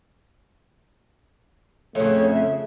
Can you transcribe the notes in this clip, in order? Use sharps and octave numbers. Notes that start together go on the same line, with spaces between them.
F2 C#3 A3 C#5
E5